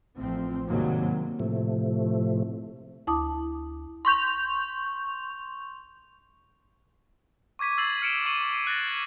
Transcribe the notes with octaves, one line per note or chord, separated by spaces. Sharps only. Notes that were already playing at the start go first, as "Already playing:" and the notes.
A1 F3 C4
D#2 G#2 C3 F#3 G3 A#3
A2 C3 F3 A3
D2 E4 A5 D6 D#6
C6 C#6 G6 F7
C#6 D6 G#6 B6 D#7
E6 G#6 A6 C7 D#7 F#7
F6 C#7 D7 E7
C#6 C7 D#7 F#7
F#6 A6 A#6
G#6